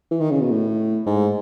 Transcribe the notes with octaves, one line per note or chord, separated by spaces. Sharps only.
E3
D#3
C#3
B2
A2
G#2